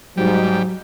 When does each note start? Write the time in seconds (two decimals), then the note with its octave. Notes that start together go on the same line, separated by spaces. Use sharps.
0.17 G#2 F#3 G3